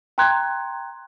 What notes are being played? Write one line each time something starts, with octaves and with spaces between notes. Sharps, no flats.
G5 A#5 C6 F#6 G#6